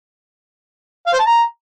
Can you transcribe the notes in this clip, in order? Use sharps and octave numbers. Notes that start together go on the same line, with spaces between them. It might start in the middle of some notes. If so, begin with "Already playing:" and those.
F5
C5
A5
A#5